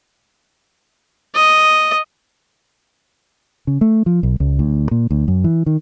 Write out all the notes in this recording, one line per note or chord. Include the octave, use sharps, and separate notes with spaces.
D#5
C#3
A3
F3
B1
C#2
D2
A#2
D2
F#2
E3
D#3